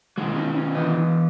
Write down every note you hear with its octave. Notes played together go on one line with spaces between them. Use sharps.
B1 D#3 F#3 G#3
C#4 D#4
C#4
E3 B3 D#5